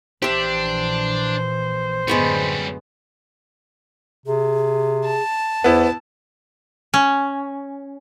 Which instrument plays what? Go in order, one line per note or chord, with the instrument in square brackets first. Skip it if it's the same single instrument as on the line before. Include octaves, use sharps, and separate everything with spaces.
[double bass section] A#1 E3 [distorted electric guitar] D4 [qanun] G4 E5 [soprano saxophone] C5
[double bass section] F#2 A2 D3 [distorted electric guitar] G3 C#4 [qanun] G#3 B3 C#6
[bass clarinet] C3 [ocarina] G#4
[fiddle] A5
[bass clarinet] E2 [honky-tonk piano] B3 E4 [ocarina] C5
[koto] C#4